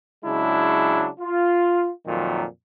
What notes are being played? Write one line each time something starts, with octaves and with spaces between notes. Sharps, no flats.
C#3 F#3 G#3 D4 E4
F4
F2 A#2 D#3 F#3